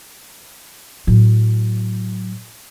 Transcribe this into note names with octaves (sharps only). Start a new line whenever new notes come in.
A2 F#3